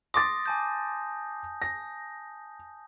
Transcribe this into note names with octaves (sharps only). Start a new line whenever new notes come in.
C6 D6 D#6 A6 A#6
G#5 A5 G6
A#6